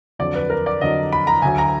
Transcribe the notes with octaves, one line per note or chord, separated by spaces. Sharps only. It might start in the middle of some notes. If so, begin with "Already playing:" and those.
F2 D3 F#3 D5
B4
A#4
D5
F2 D3 F#3 D#5
B5
A#5
D2 D3 F#3 G#5
A#5